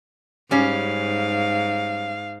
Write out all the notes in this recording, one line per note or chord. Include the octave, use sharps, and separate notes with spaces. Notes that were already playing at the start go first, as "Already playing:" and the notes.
G#2 G3 C#4 F5